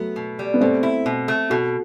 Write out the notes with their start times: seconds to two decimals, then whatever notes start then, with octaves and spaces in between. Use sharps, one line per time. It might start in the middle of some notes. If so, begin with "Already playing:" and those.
Already playing: F#3 A3 B3
0.16 B2
0.39 G3
0.54 B3
0.60 B2 A3 C4
0.83 E4
1.06 B2
1.28 A3
1.50 B2 F#4 A4